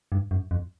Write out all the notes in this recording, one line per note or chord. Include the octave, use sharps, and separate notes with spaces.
G2
F#2
F2